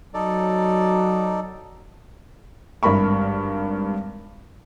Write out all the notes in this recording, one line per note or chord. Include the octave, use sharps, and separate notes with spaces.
F#3 D#4 A4 D5
G#1 G2 A#4 B5 C#6